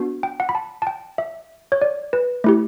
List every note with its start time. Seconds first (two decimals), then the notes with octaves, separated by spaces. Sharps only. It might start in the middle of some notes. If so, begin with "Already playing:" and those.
Already playing: B3 D4 F#4
0.23 G5
0.40 F#5
0.49 B5
0.55 A5
0.82 A5
0.87 G5
1.18 E5
1.72 C#5
1.81 D5
2.13 B4
2.44 A3 E4 G4